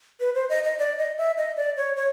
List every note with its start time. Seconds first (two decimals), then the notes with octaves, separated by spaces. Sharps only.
0.20 B4
0.35 C5
0.49 D#5
0.64 D#5
0.79 D5
0.98 D#5
1.18 E5
1.38 D#5
1.57 D5
1.77 C#5
1.96 C#5